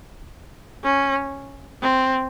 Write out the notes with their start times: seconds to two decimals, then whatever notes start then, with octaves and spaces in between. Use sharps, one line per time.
0.84 C#4
1.81 C4